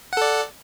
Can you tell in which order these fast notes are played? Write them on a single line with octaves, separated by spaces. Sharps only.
F#5 A4 D5